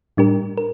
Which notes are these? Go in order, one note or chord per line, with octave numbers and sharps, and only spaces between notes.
A2 G3 D4 G4 A#4
A#4